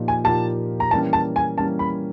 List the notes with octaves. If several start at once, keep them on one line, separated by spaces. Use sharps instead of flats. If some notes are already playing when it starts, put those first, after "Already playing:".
Already playing: A#2 F3 A#3 D#4 G4
G#5
A#2 F3 A#3 D#4 G4 A5
A#5
E3 G3 A#3 C#4 A5
A5
G#5
E3 G3 A#3 C#4 A5
B5